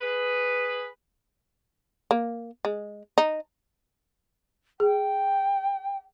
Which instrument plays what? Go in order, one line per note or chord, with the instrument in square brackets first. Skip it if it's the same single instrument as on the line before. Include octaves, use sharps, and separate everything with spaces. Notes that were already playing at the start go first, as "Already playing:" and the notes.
[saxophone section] G#4 B4
[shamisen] A#3
G#3
D#4
[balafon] G#4 [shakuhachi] G5